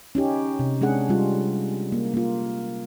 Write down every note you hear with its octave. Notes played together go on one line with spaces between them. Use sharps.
C#4 D#4 G4
C3
G#3 C#4 D4 G#4 F#5
G3 F4
A#3
A#3 F4